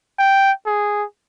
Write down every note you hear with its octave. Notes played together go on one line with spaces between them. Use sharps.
G5
G#4